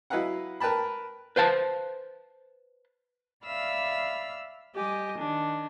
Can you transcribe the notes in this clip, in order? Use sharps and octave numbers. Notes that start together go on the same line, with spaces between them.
F#3 E4 B4 D#5 F5 F#5
A#4 B4 G5 A5 B5
B4 C5 F5 A5
D5 E5 F5 B5 E6 F6
G3 G4 D#5 G#5
D#3 D4